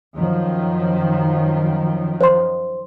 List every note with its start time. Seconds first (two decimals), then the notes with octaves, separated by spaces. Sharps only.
0.16 F#2 D#3 F3
2.21 C5 C6